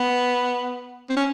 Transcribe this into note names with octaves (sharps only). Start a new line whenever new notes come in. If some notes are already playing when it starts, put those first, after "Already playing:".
Already playing: B3
C4
C#4